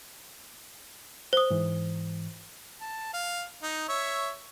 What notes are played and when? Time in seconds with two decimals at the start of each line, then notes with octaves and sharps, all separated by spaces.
1.33 C5 D#6
1.50 G#2 E3
2.81 A5
3.13 F5
3.62 D#4
3.88 C#5 E5